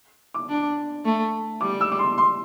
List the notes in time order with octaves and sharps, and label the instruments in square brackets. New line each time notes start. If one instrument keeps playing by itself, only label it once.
[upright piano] D6
[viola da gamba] D4
A3
[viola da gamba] G3 [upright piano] D6
[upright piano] E6
D6
C6
C6